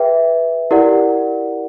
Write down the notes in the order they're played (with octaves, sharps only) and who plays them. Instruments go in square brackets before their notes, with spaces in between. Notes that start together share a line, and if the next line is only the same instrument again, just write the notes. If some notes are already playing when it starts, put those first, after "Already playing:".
Already playing: [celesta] G#4 B4 E5 G5
E4 G4 A#4 D5 F#5